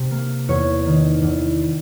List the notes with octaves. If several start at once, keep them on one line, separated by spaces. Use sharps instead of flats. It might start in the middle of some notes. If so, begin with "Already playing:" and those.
Already playing: C3
A#3
E2 C#5
D#3
E2